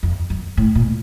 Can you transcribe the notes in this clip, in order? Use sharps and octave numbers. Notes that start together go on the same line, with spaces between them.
F2
F#2
A2
A#2